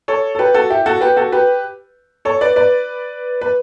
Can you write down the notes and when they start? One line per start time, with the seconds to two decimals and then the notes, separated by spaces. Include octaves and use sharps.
0.08 A4 C#5
0.35 A4
0.39 G4 B4
0.54 F#4 A4
0.70 E4 G4
0.86 F#4 A4
1.01 G4 B4
1.17 F#4 A4
1.32 G4 B4
2.25 A4 C#5
2.41 B4 D5
2.56 B4 D5
3.41 B4